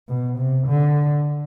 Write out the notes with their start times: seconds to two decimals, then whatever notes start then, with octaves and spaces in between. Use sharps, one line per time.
0.08 B2
0.39 C3
0.68 D3